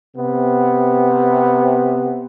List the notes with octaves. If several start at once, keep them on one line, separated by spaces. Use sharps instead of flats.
C3 B3